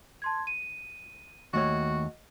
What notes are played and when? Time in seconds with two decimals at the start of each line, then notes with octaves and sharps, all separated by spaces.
0.22 A5 C6 G#6
0.47 D#7
1.53 D#2 A3 F#4 C#5 D#5